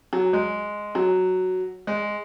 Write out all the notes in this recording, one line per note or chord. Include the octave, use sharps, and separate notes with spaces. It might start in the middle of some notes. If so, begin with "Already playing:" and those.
F#3
G#3
F#3
G#3